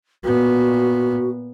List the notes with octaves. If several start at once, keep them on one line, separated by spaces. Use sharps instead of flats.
A#2 B3 F#4